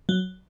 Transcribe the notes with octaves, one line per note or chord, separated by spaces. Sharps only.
F#3